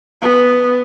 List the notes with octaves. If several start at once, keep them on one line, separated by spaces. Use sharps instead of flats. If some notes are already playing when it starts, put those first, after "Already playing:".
B3